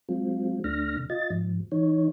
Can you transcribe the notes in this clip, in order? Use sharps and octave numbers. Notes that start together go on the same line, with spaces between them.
F#3 G#3 C4 F4
D2 A3 D4 F6 A#6
C3
F4 D#5 A6
G#2 F3
E3 D#4 C#5